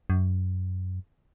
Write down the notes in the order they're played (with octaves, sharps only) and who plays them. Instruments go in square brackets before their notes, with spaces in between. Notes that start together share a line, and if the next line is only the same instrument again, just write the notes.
[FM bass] F#2